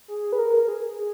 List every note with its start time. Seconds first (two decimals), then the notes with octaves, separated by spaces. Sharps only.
0.08 G#4
0.32 B4
0.39 A#4
0.68 G#4
0.97 G#4